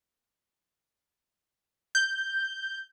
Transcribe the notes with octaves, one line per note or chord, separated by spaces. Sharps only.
G6